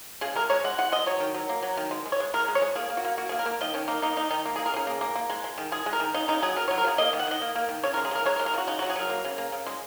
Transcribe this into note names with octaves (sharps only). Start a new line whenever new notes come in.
C#3 G#4
G#3 A#4
G#3 C#5
G#3 F#5
G#3 F#5
G#3 D#5
F#3 C#5
D#3
F#3
A#3
F#3
D#3
G#3
G#3
C#5
G#3
G#3 A#4
G#3
C#5
G#3
A#3 G#4
A#3
F#4
A#3
A#3 F#4
A#3 G#4
A#4
A#3
D#3 D#5
D#3 C#4
A#3 D#4
A#3 D#4
A#3 D#4
D#3 D#4
A#3
G#4
A#3
A#4
C#3 G#4
A#3
A#3
A#3
G#3
G#3
D#3
G#3 G#4
G#3
A#4
D#3
C#3 D#4
C#3 D#4
F#3 G#4
F#3 A#4
C#5
F#3
A#4
C#3 G#4
A#3 D#5
D#3
F#5
D#3 D#5
A#3
A#3
D#3
C#3 C#5
A#4
G#3
G#4
C#3 A#4
G#3 C#5
A#4
G#3
A#4
C#3 F#4
C#3 D#4
F#4
F#3
G#4
F#3 A#4
A#3
C#3
A#3
C#3
G#3